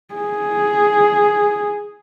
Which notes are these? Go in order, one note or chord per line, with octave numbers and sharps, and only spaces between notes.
G#4